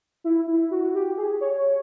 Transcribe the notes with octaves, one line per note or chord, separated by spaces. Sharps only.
E4
E4
F#4
G4
G#4
C#5